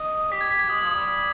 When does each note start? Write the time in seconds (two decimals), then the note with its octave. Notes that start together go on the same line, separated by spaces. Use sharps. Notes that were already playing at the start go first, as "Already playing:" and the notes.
Already playing: D#5
0.31 G4 B6
0.41 G#6
0.51 B6
0.59 G#6
0.69 G#3 D#6
0.82 F3
0.95 G3
1.07 G3